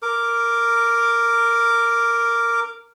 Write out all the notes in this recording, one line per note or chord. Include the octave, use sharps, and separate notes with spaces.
A#4 D6